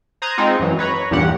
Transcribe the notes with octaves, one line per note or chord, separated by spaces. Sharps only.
C5 A#5 D#6 F#6 G#6
G#3 C4 D#4 F4
F#2 E3 F#3
B4 C#5 A#5 B5
E2 G2 A#2 G4 F#5